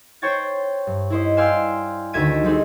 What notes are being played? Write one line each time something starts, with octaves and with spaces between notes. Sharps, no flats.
C5 C#5 G5 C#6 G#6 A6
G2
E4 C5 D#5
D5 F5 G5 G#5 C6 E6
D2 D#3 E5 G#6 B6 D#7
G3 C4 D#4 G#4